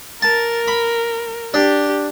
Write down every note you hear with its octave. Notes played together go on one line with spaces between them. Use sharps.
A#4 A5
B5
D4 G4